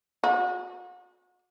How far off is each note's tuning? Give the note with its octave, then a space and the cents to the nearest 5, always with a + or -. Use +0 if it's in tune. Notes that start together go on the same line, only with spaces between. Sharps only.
F#4 -35